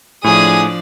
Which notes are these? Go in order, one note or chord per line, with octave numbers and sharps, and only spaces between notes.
A2 F3 D4 G#4 D5 G#5 D#6